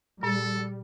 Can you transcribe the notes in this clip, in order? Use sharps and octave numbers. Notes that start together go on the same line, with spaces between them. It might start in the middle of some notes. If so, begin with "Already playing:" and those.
A#2 G3 A4